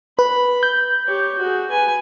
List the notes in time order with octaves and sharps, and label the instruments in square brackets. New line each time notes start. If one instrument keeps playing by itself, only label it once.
[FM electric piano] B4 [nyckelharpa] B5
[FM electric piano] G6
[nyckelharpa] G4 C#5
F#4 G#4
B4 G#5